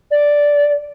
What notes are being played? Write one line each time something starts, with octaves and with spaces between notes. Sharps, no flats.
D5